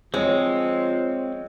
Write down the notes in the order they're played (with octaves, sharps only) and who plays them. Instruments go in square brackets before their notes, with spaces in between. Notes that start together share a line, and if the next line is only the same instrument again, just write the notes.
[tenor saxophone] F3 [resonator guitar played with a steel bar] G#3 [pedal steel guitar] C4 [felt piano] C#5